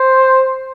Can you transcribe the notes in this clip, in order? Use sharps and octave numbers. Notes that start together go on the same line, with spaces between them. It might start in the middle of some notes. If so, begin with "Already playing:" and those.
Already playing: C5